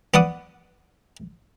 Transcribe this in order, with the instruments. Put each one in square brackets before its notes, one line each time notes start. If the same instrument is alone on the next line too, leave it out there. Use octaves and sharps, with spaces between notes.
[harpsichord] B3 D5 F#5 D#6